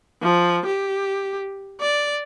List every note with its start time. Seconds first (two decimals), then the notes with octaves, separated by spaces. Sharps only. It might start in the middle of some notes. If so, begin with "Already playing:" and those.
0.22 F3
0.66 G4
1.81 D5